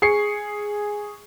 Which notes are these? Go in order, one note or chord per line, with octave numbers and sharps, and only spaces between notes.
G#4 C#6 C7 C#7